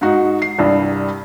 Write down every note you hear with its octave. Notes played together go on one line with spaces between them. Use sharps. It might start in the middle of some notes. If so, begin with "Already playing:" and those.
G#2 D#4 F#4
C7
C2 G2 G3